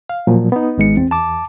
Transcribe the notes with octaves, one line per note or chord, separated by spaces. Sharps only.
F5
A#2 F3 F#3
B3 D#4
G#1 G#3 C#7
E2 C4
A5 D6